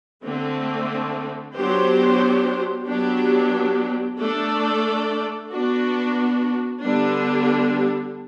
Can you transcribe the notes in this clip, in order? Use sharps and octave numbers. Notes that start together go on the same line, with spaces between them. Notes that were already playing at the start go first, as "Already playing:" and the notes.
D3 A3 C4
F#3 B3 D4 G4 C5
F#3 B3 D4 G4
A3 D4 A4 D5
B3 D4 F#4
D3 G3 B3 D4